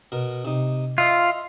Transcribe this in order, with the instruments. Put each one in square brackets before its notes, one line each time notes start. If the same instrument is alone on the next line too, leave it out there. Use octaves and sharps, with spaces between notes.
[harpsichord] B2 A#4
C3 D#4
[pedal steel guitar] F4 [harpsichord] D#5 E5